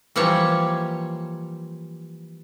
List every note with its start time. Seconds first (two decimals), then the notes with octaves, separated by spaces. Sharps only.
0.16 E3 F3 G3 A#3 C#5